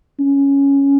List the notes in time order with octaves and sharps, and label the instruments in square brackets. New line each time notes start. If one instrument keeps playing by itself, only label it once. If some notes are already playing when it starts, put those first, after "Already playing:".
[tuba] C#4